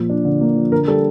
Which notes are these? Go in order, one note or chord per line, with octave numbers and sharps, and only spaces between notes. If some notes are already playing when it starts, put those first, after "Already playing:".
Already playing: A#2 F3 A#3
D4
D3
A#3
F3
D3 A#4
G3 A4